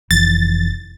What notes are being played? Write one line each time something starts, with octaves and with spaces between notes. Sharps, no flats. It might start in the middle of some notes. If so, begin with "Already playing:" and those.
F1 F2 E3 D#4 A6